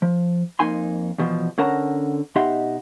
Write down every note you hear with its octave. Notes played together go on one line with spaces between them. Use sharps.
F3
F2 A#3 D#4 G#5 C6
E2 B2 E3 F3
D3 C#4 A#4 F#5 A5 A#5
B2 D#4 G4 E5 F#5 C6